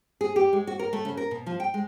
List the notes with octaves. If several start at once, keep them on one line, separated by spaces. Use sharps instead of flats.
G#4
G4
G#3
F#4
A#4
A3
C#3
A#4
B2
F3
G5
G#3